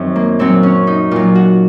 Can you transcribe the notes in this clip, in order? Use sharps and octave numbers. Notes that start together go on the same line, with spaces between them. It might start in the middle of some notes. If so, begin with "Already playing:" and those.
Already playing: F#2 D#3 C4
A#3
A#2 F#3 C4
C#4
D#4
A#2 F#3 F4
F#4